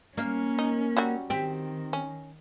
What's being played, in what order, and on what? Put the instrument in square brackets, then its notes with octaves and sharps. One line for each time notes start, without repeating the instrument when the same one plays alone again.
[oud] A#3 F5 [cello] C#4
[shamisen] D#4
F#3 G3 F#4
[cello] D#3 [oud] C4 G4
[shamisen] C#4